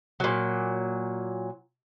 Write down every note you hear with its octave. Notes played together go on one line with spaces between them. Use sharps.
A#2 F#3